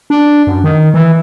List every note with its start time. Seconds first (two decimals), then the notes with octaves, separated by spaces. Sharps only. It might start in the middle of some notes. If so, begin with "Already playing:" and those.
0.10 D4
0.47 F#2
0.64 D#3
0.94 E3